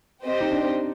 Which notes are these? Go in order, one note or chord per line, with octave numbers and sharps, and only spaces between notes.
C4 G4 C5 D#5
D#4
D4